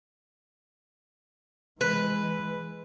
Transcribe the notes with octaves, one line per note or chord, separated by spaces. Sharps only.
E3 G#3 B4